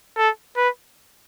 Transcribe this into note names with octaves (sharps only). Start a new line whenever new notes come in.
A4
B4